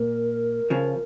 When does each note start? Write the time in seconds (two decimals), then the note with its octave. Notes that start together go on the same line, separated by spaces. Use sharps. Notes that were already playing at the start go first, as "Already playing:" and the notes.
Already playing: A#2 A#4
0.70 C#3 F3